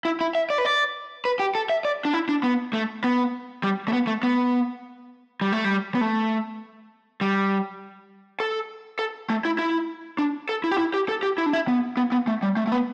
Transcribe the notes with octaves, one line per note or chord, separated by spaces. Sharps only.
E4
E4
E5
D5
B4
D5
B4
G4
A4
E5
D5
D4
E4
D4
B3
A3
B3
G3
A3
B3
A3
B3
G3
A3
G3
B3
A3
G3
A4
A4
A3
E4
E4
D4
A4
E4
G4
E4
G4
A4
G4
E4
D4
E4
B3
B3
B3
A3
G3
A3
A3
B3